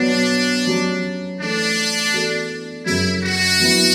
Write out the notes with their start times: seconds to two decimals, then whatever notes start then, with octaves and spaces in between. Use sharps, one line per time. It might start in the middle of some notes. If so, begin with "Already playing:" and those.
Already playing: B2 F#3 B3 D4 F#4 C#5
0.67 F#3 C#4 G4 C#5
1.40 E3 A3 D4 E4 A4
2.12 E3 B3 F#4 A4 D5
2.86 F#2 C#3 F#3 E4
3.22 F#4
3.60 F#3 B3 E4